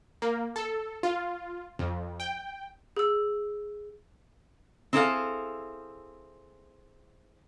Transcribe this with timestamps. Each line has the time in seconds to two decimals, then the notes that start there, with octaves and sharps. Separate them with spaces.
0.22 A#3
0.56 A4
1.03 F4
1.79 F2
2.20 G5
2.97 G#4 E6
4.93 C4 E4 G#4 A4 F5